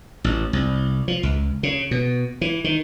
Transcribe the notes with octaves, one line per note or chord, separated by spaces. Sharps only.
A1
C2
F3
C#2
C#3
B2
E3
D#3